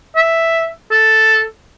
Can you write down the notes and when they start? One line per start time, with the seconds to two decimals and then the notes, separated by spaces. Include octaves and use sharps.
0.16 E5
0.91 A4